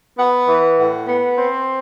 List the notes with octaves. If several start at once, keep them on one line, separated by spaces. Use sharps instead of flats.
B3 F#5
E3
A2 F#5
B3
C4 C5